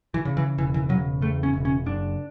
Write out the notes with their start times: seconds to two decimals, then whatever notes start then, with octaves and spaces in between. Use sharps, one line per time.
0.14 E3
0.25 C#3
0.37 E3
0.58 E1 E3
0.74 E3
0.89 C#3 F#3
1.21 E2 A3
1.43 C#4
1.53 E1
1.65 C#4
1.86 F#1 D4